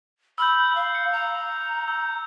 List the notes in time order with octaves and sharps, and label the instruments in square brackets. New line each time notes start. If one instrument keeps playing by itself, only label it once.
[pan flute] B5 [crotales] E6 F6 G6
[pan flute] F5
[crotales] C#7
[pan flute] A#5
[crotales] E6 G6